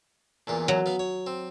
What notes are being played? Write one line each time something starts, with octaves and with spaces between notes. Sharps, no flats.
E2 A#2 F4
F#3
B3 F5
C#5
C4